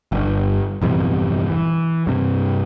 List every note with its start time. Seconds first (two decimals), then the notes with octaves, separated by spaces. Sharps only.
0.12 G1 G2
0.81 A#1 E2 G2 C3
1.49 E3
2.07 G2 C3